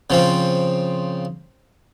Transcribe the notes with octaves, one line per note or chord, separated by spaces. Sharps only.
C#3 F3 C4